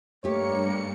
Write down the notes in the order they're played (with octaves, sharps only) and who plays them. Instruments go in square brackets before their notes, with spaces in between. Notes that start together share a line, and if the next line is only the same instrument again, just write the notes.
[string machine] G2 C#7 [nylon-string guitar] A3 G4 [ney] A#3 [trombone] C#5